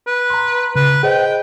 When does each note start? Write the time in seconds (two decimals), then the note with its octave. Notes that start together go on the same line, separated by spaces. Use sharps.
0.07 B4
0.30 A#5 C6
0.76 C#3 B4
1.03 G#4 C5 D#5 G5